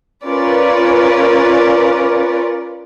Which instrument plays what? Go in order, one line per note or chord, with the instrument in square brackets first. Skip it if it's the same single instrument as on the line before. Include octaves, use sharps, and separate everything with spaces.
[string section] C#4 F4 A#4 B4 D5